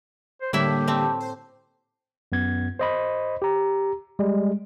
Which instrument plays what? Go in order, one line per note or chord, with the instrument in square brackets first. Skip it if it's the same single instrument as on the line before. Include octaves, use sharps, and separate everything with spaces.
[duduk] C5
[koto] A2 E4 E5 [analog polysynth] D3 G3 A#3 [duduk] G4
[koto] A3 C4
[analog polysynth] C5
[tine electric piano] F#2 B3 G#6
C5 D#5 B5
G4 A#5
G3 G#3